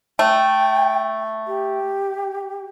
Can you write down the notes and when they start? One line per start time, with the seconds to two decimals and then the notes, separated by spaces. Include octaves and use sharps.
0.19 A3 G5
1.47 G4